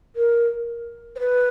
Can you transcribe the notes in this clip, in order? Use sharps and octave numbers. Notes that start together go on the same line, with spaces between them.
A#4
C5
B4